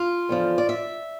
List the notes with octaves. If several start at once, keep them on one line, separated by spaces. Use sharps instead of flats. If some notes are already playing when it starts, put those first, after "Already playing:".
Already playing: F4
E2 D3 F3
D5
E5